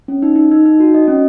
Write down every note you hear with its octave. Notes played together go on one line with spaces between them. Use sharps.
C#4
D#4
D#4
D#4
D#4
F#4
D#5
C#4